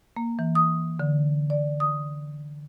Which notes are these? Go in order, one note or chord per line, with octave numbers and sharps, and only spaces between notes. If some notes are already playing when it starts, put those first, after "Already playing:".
A#3
E3
D#6
D3
D5
D#6